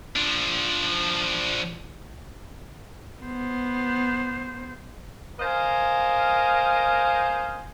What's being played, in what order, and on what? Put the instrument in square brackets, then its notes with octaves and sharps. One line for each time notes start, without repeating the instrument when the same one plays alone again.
[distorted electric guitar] F3 D4
[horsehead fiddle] B3 C5
[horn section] A#4 C5 D#5 F5 G#5